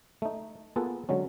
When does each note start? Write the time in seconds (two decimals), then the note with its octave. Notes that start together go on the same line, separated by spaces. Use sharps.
0.22 A3 D#4
0.76 A#3 B3 F4 G#4 A4 B4
1.09 D3 F#3 G#3 C#4